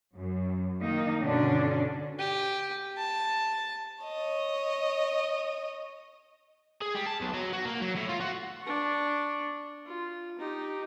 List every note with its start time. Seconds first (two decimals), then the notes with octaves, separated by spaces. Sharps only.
0.15 F#2
0.81 D#3 A#3 D#4
1.22 G2 B2 D3 C#4 D4
2.20 G4
2.98 A5
4.04 C#5 D#5
6.82 G#4
6.95 G3
7.07 A5
7.21 B1
7.34 F#3
7.53 F#4
7.65 A#3
7.82 F#3
7.96 A2
8.09 F4
8.20 F#4
8.62 D4 C#6
9.85 F4
10.39 D#4 G4